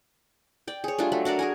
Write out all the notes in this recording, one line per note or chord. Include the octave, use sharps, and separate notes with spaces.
D5 G5
G#4 C#5
G3 A3 D4 F4
F#3 A3
D4 F#4 A#4 D5
G#4 A#4 G#5